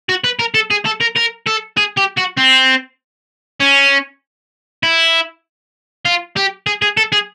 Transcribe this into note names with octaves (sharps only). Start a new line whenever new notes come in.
F#4
B4
A#4
A4
G#4
A4
A#4
A#4
A4
G#4
G4
F#4
C4
C#4
E4
F4
G4
G#4
G#4
A4
G#4